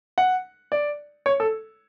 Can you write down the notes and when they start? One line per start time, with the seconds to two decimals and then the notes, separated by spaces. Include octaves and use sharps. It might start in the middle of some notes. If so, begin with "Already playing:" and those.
0.18 F#5
0.72 D5
1.26 C#5
1.40 A4